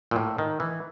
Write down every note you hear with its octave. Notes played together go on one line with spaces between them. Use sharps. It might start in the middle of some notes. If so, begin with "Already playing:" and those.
A#2
A2
D#3
E3